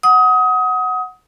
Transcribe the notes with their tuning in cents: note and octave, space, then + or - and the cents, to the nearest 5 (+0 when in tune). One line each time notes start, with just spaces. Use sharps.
F#5 +0 D#6 +25